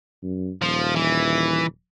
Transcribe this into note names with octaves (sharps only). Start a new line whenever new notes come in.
F#2
D#1 F3
E3